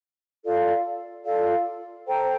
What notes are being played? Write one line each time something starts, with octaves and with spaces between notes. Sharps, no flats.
F4 A4 D5 F5
F4 A4 D5 F5
A4 C5 G5 A#5